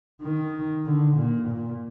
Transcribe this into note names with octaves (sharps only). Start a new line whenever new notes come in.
D#3
D3
A#2
A#2